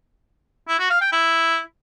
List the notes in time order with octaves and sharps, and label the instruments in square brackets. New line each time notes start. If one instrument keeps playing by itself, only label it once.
[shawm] E4
F#4
F5
G5
E4